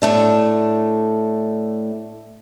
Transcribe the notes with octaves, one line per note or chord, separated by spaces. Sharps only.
A2 A3 D4